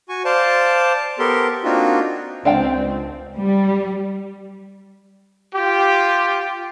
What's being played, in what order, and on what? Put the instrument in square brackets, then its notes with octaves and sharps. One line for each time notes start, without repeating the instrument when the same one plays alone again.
[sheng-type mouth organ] F#4 G#5 C#6
C5 D5 F5 A5
B3 G4 A4 A#4 C6
A#3 C4 D4 D#4 F4 F#4
[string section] C#2 C4 [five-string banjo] D4 F5 G5
[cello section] G3
[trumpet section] F4 G4